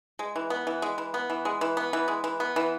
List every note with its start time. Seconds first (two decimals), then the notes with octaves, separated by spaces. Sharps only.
0.19 G#3
0.36 E3
0.50 B3
0.67 E3
0.82 G#3
0.98 E3
1.14 B3
1.30 E3
1.45 G#3
1.61 E3
1.77 B3
1.93 E3
2.08 G#3
2.24 E3
2.40 B3
2.56 E3